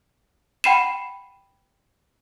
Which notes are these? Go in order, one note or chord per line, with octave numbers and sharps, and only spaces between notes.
F#5 G5 B5 C7 D#7 E7